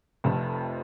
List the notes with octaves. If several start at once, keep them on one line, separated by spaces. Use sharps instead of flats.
F1 F2 C3 F3 A3